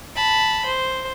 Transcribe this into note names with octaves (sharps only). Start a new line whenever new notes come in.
A5 B5
C5